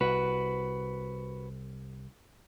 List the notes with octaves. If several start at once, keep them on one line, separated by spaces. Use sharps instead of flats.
C2 F#4 B4